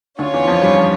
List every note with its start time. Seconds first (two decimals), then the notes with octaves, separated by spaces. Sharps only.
0.19 D2 D3 C#4 F4 C#5
0.33 E2 E3
0.44 E3
0.47 F2 F3
0.62 G2 G3
0.77 F3